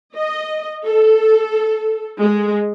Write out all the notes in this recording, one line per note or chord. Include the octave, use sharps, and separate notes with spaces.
D#5
A4
G#3